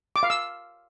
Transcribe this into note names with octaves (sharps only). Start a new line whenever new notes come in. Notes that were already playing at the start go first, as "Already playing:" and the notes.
D6
F5
E6